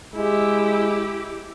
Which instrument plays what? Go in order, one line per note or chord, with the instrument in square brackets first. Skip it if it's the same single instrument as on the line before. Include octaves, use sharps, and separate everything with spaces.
[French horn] G#3 [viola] E4 G4